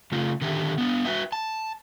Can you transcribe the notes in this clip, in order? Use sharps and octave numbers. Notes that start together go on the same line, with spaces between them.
C#3 A3 F4
D3 D#3 G4 E5
B3 D4
F#4 B4 E5
A5